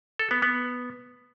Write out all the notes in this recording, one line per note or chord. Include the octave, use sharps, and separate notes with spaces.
A4
B3
B3